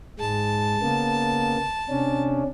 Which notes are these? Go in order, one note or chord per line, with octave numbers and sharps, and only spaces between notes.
G#2 G#3 A5
C#3 A#3 B3
C3 C#4 D4